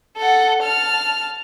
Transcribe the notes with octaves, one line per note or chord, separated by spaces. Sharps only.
A4 F#5
A5 F6